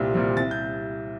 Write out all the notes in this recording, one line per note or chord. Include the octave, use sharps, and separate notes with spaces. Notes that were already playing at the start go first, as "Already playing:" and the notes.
Already playing: C2 A#2 G3 C4
A#2 G3 C4
C2 A6
G6